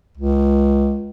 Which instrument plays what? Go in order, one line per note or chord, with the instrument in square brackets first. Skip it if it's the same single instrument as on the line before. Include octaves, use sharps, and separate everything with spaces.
[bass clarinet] C#2